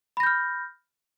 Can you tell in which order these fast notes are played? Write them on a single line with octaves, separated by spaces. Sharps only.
B5 A#6 G6 F6